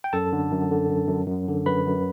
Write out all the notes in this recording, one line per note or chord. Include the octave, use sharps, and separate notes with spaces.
G5
F#2 A4 A5
D3
F#2
D3
F#2
F#2
F#2
D3
F#2 B4 B5
F#2